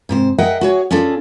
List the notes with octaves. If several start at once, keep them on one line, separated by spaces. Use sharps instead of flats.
G#2 C3 C5
G#4 A#4 D#5 E5 F#5 G5
F#4 G#4 C#5
C#4 D4 F4 G#4 A4